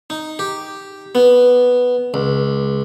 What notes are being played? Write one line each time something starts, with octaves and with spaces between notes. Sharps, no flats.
D#4
G4
B3
C#2